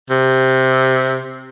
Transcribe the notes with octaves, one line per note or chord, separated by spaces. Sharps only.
C3